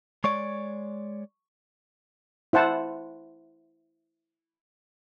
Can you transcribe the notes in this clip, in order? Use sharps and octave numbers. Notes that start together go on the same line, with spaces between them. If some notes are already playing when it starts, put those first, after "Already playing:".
G#3 C#5 D5 C#6
E4 C5 F#5 A5